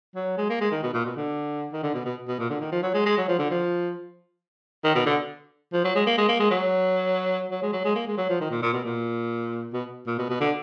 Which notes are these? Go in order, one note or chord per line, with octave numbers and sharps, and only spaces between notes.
F#3
G#3
A#3
G#3
D#3
B2
A#2
B2
D3
D#3
D3
B2
B2
B2
A#2
D3
D#3
F3
F#3
G#3
G#3
F#3
F3
D3
F3
D#3
B2
D3
F3
F#3
G#3
A#3
G#3
A#3
G#3
F#3
F#3
G#3
F#3
G#3
A#3
G#3
F#3
F3
D#3
A#2
A#2
B2
A#2
B2
A#2
B2
B2
D3